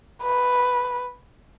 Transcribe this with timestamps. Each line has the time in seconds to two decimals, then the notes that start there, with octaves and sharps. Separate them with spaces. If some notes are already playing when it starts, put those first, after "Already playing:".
0.23 B4